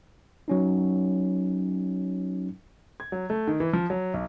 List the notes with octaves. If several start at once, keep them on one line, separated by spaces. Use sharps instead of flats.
F#3 C#4 D#4
G#6
F#3
A3
D#3
E3
F3
F#3
B1